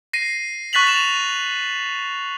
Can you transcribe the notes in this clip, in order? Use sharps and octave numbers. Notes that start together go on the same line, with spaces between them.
A#6 C7 D#7
C#6 F#6 A6 B6 F7 F#7
E7 F7